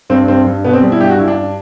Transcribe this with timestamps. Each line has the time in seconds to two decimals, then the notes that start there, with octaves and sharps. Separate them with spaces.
0.10 G2 C4
0.28 G2 C4
0.46 G2
0.65 B2 B3
0.73 C4
0.82 G3
0.92 E4
1.01 G2 G4
1.10 F#4
1.19 G2 E4
1.28 D4